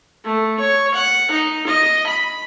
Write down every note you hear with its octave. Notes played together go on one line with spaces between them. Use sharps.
A3
C#5
F#5
D#4
D#5
B5